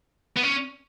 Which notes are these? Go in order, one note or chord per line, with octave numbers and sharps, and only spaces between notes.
B3
C#4